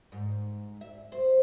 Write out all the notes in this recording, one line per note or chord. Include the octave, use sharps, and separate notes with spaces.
G#2
E5
C5